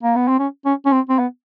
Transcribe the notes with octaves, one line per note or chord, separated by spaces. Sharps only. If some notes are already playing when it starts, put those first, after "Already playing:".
A#3
B3
C4
C#4
C#4
C#4
C4
C4
B3